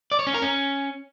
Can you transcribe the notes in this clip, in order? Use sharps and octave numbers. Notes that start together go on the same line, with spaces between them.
D5
C#5
C#4
A#4
C#4